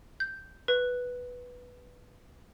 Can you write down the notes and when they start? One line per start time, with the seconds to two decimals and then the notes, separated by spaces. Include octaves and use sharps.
0.20 G6
0.68 B4